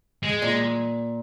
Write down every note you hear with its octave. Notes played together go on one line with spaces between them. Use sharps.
G#3
A#2